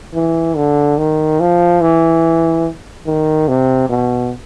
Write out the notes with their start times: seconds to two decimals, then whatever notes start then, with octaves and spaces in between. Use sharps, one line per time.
0.14 E3
0.56 D3
0.98 D#3
1.40 F3
1.81 E3
3.06 D#3
3.48 C3
3.89 B2